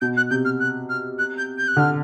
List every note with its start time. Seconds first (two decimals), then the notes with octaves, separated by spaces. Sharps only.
0.01 B2 G6
0.17 F#6
0.30 C3 G6
0.44 F6
0.60 F#6
0.89 F6
1.18 F#6
1.37 G6
1.57 G6
1.67 F#6
1.77 D3 F6